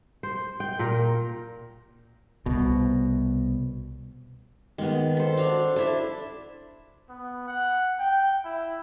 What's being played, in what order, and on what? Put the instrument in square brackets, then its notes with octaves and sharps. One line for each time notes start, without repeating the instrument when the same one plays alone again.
[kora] C5
G5
A#2 A#4
[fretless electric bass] C2 B2
[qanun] D#3 [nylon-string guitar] G#3 A#3 B3
[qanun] A4 C5
[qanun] D4 F5 [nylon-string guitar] F#4
[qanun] D4 E4 E5 [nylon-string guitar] A4
[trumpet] B3
F#5
G5
E4